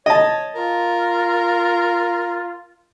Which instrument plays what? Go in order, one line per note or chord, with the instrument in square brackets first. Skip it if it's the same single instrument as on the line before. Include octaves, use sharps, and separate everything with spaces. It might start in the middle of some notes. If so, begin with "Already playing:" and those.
[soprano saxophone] C#5 [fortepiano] D#5 A5
[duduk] F4 [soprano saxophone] A#4